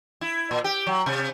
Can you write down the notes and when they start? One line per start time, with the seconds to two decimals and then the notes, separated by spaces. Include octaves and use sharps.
0.21 E4
0.51 A#2
0.64 G4
0.87 F#3
1.06 C3